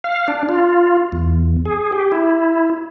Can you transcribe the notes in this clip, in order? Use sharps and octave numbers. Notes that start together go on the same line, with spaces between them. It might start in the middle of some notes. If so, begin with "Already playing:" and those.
F5
D4
F4
E2
G#4
G4
E4